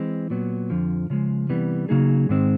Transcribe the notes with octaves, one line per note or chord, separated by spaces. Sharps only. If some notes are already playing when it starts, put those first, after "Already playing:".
Already playing: E3 G#3 C4
A#2 F#3 B3
F2 D3 F3
C#3 F3 G#3
C3 E3 G3 B3
C#3 F#3 A#3 D#4 G#4
G#2 D#3 G#3 C4